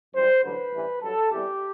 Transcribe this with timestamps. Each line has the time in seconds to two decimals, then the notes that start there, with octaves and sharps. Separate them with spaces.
0.14 F#2 E3 G3 C5
0.43 A1 G2 D3 F#3 B4
0.73 A1 G2 E3 G3
1.02 G2 F#3 A4
1.31 E2 C3 E3 G3 G4